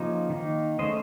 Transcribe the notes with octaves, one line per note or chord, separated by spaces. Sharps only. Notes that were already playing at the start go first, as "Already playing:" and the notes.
Already playing: C#3 F3 A#3 D#4 C5
D#3 A#3 D#4
C#3 A3 C#4 C5 D#5